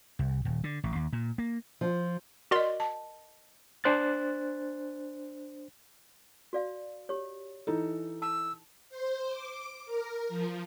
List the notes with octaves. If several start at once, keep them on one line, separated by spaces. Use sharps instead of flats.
C2
D#1
D3
A1
D#2
A#2
A#3
F3
F#4 A#4 D5 D#5 C6
A5
D4 C5 F#6 A6
F#4 D5 F5
G4 C#5
E3 D#4 A4
A5 E6
C5
D6
A#4
F3